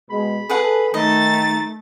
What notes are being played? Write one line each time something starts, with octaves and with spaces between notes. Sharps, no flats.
B2 G#3 B5
G#4 A4 B4 F#5
D#3 A3 D#4 D#5 A6